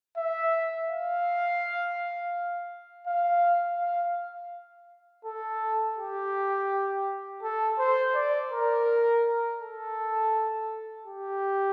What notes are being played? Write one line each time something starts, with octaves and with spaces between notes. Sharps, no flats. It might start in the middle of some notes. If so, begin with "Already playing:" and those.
E5
F5
F5
F5
A4
G4
A4
C5
D5
A#4
A4
G4